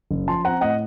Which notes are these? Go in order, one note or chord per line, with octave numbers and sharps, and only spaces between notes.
F#1
F3 A5 C6
C4 F#5 A#5
A2 D#5 F#5